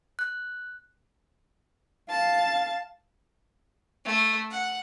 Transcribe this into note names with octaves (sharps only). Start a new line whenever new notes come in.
F#6
F5 A5
A3
F#5